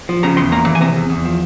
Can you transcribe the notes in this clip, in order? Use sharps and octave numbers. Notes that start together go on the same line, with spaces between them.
F3
C#3 A#5
E2 C6
A#3 A#5
E3
G#5
C3 A#5
E2
E2
F3